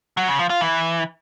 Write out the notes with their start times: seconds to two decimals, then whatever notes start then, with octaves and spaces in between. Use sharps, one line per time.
0.17 F#3
0.28 C#3
0.39 F3
0.50 F4
0.61 E3